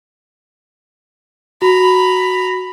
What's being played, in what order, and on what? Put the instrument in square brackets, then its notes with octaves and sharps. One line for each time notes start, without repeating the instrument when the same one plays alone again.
[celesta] F#4 [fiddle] A#5 B5